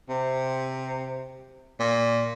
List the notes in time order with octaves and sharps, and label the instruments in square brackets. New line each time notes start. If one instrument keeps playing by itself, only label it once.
[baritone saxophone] C3
A#2